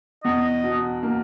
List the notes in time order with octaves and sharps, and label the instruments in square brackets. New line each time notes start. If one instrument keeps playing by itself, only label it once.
[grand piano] E2 [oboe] D#5
[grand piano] B2
A#3